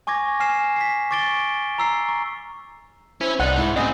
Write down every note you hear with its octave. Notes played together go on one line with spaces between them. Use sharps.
G#5 C#6 D6 G#6 A#6
G#5 F6 C7 E7
B6 C7
C#6 D6 A6 D7 G7
A#5 E6 C7
C#6
C#4 E4 C5
C2 D#4 D5 F#5
G#2 E4
A2 C#3 C4 D#5 G#5